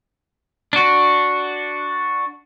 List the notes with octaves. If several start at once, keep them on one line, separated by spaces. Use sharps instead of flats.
D4 F#4